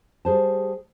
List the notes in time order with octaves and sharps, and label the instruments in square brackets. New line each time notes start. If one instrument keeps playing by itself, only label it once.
[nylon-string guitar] G3 G#4 C5 A5